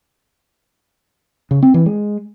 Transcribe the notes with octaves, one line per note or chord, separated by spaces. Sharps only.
C#3
C4
E3
G#3